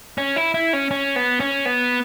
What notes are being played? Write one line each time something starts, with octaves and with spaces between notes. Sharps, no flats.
C#4
E4
E4
C#4
C#4
B3
C#4
B3